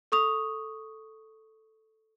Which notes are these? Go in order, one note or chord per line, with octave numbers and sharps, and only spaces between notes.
A4 C#6 D#6 F7